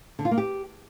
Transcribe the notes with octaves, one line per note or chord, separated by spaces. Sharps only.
D3
F4
A#3
G4